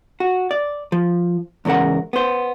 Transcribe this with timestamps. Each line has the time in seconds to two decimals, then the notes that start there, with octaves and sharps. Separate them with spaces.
0.20 F#4
0.51 D5
0.92 F3
1.65 E2 G#2 C#3 A#4 F#5
2.13 B3 C5